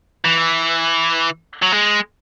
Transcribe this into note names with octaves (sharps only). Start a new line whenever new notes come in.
E3
F#3
G#3